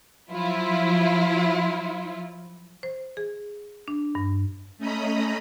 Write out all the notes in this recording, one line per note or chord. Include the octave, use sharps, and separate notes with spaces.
F3 F#3 E4 F4
C5
G#4
D4
G2
A3 C#4 D#5 A#5 B5 D#6